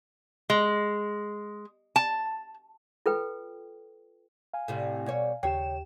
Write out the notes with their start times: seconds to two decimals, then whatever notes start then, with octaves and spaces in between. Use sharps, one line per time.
0.50 G#3
1.96 A5
3.06 F4 A4 B4 G5
4.53 F5 G#5
4.68 A2 C3 G3
5.06 B2 G3 C#5
5.43 D#2 C#3 G4 C#5 G5 E7